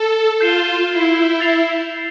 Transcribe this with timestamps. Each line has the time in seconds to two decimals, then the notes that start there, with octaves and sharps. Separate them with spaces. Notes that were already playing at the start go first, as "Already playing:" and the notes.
Already playing: A4
0.41 F4 G6 C7 E7 G7
0.90 E4
1.40 A6 C7 F7